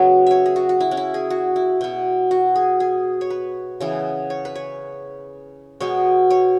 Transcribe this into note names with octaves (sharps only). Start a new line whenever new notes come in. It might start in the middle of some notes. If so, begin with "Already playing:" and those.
Already playing: C#3 F#3 B3 B4 C#5
C#5 E5
G#4
F#4
F#4
E4
C#4
E4
G#4
F#4
E4
B2 B3
F#4
G#4
G#4
C#5
B4
C#3 E3 B3
C#5
B4
C#5
B2 G#3 B3 C#5
C#5